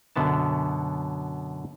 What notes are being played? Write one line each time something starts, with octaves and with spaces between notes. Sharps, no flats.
F#2 B2 D3 B3 A5